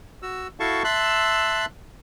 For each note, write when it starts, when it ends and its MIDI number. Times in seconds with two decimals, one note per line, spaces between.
0.22 0.47 66
0.22 0.47 88
0.60 0.83 64
0.60 0.83 66
0.60 0.83 69
0.60 0.83 77
0.60 0.83 81
0.60 0.83 85
0.84 1.66 76
0.84 1.66 81
0.84 1.66 84
0.84 1.66 88
0.84 1.66 90